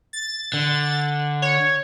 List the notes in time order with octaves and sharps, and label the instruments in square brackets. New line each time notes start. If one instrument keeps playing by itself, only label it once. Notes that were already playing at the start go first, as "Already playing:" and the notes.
[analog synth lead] A6
[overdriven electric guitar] D3
[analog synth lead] C#5